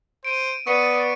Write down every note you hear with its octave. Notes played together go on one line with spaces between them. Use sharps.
C5 D7 D#7
B3 D5 C#6 D#6 C#7 D#7